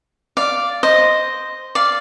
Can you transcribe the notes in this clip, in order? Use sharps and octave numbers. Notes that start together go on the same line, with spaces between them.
D5 F5
C5 D#5
D5 F5